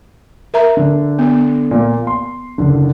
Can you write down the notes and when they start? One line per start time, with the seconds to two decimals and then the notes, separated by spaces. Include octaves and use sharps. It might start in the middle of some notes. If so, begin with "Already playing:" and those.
0.54 A#4 E5 A#5
0.77 D3
1.19 B3
1.71 A#2 A#3
2.07 C6
2.58 F#1 D3